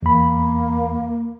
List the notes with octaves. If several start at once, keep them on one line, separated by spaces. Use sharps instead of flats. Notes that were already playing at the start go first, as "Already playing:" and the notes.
E2 A#3 B5